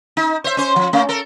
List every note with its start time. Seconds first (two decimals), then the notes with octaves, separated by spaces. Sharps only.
0.17 D#4
0.44 C5 E5
0.57 C#4 C5
0.76 F3
0.93 A3 C#4
1.09 A4 A#4